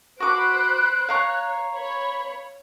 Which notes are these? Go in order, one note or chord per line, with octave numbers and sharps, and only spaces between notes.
F#4 C5 B5 D6 F#6 D7
C#5 F5 A#5 C#6
C#5 B5